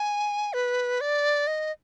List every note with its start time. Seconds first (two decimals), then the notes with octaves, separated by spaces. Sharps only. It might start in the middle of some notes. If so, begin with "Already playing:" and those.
Already playing: G#5
0.53 B4
1.01 D5
1.47 D#5